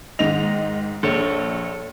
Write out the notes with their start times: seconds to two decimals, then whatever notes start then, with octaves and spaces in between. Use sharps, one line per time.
0.19 G#2 D#3 D#5 F7
1.03 A#1 A4 C#5